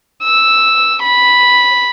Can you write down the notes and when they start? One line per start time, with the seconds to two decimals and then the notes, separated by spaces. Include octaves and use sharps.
0.23 E6
1.02 B5